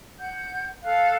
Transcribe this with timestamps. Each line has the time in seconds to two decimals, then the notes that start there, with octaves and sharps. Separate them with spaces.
0.20 F#5 G6
0.84 A4 F5 F#6